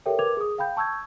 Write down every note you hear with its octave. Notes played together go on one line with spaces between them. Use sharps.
G4 A4 A#4 C#5 E5 G5
A#4 B4 D6 G#6 F7
G#4 D#6
F5 G5 B5 G6
A5 C#6 E6 G6 G#6